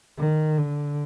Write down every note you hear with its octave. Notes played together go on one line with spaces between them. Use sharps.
D#3
D3